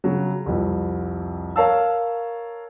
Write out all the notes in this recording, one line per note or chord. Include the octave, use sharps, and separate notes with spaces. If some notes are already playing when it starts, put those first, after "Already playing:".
C#3 F#3
C2 F2
A#4 C#5 F5 A5 E6